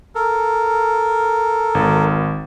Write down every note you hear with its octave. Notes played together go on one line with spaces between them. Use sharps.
A4 A#4
G#1